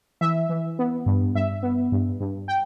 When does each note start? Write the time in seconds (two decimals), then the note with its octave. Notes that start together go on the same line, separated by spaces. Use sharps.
0.21 E3 E5
0.49 E3
0.79 B3
1.06 G2
1.35 G2 E5
1.63 B3
1.92 G2
2.20 G2
2.48 G5